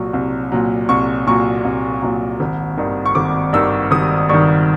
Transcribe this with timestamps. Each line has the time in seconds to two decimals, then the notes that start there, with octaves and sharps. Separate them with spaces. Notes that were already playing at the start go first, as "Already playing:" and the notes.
Already playing: C2 A#2 F#3 C#6
0.13 C2
0.52 A#2 F#3
0.89 C2 C#6
1.27 A#2 F#3 C#6
1.65 C2
2.02 A#2 F#3
2.40 G#1
2.77 G2 D#3
3.06 C#6
3.15 G#1 D6
3.53 G2 D#3 E6
3.91 G#1 D#6
4.29 G2 D#3 C#6